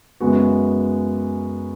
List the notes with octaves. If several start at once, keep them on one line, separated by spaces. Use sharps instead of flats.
F#2 C#3 G#3 B3 F#4